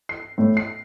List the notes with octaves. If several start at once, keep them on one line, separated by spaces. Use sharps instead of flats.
C7
A2
C7